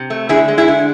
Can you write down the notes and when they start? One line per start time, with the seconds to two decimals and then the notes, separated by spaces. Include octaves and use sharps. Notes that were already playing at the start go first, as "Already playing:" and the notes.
Already playing: C3
0.10 A3
0.29 D3 E4 G#4
0.48 G#3
0.58 E4 G#4
0.68 D3